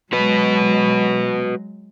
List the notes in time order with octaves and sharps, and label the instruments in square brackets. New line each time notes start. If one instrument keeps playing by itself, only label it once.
[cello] F#3 G#3 [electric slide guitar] F#4 B4